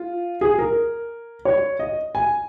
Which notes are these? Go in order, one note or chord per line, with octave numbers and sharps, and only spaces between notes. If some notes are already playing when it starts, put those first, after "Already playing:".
Already playing: F4
G#4
A#4
C#5
D#5
G#5